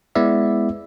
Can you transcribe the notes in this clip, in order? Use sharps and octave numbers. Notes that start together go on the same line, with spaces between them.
G#3 B3 E4 D5 E5